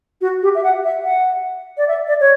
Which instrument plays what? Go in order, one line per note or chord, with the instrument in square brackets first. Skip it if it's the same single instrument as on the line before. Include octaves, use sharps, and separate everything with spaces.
[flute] F#4
G4
E5
F#5
E5
F#5
D5
E5
D5
C#5